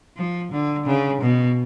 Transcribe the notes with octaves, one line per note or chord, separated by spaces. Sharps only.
F3
D3
C#3
B2